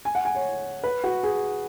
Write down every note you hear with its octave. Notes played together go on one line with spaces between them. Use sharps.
G#5
F#5
G#5
C#5
B4
F#4
G#4